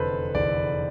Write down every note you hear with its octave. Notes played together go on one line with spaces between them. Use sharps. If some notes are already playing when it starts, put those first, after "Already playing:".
Already playing: F1 E2 D3 A4 B4 C5
F1 E2 D3 D5